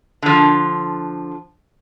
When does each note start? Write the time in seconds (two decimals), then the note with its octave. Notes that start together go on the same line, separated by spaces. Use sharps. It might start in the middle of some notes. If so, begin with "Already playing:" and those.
0.22 D3 F3